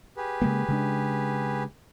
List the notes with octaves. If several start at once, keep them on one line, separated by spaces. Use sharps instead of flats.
G4 G#4 B4
C#3 G#3 A#3
C#3 G#3 D4